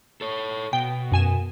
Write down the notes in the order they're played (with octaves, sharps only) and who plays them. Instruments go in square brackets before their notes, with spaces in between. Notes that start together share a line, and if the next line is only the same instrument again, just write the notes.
[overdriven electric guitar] A4 C#5
[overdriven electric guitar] B2 [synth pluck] G5
[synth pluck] F#2 G#5 E7